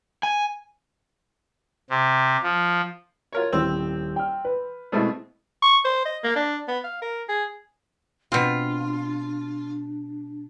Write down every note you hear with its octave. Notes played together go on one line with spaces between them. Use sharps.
G#5
C3
F3
F4 A#4 C#5
D#1 C4 E4 E6
G5 F6
B4
B2 G#3 A3 C4 E4
C#6
C5
D#5
A#3
D4
B3
F5
A#4
G#4
B2 C4 D4 F4